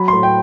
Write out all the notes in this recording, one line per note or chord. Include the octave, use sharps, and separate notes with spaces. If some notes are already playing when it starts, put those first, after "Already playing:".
Already playing: F#3 B5
C6
A2
G5